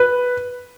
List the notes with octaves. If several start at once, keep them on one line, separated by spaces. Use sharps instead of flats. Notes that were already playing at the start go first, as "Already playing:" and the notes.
Already playing: B4